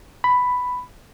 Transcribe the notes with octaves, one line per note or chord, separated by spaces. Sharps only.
B5